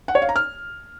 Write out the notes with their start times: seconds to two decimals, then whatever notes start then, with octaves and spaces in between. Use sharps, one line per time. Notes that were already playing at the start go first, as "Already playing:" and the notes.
0.08 F#5
0.15 C#5
0.22 F5
0.29 A#5
0.36 F6